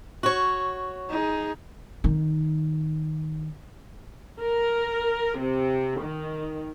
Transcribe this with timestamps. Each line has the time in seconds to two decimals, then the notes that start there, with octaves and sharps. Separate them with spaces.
0.23 F#4 C#5
1.11 D#4 G#4
2.04 D#3 D#4
4.40 A#4
5.38 C3
6.02 D#3